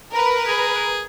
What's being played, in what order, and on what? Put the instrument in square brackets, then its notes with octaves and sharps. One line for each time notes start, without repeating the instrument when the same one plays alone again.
[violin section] A#4 B4
[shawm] G#4